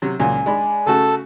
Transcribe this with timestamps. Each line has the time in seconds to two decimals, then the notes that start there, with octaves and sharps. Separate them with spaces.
0.02 C3 F#3
0.20 C#2 A#2 F#3 G#5
0.46 G#3 D4 B5
0.86 C#3 A3 F#4 A4